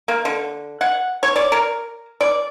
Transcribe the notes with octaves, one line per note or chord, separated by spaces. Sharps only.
A#3
D3
F#5
C#5
D5
A#4
D5